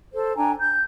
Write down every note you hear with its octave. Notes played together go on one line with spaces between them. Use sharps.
A4 C5
D4 G5 G#5 A#5
G6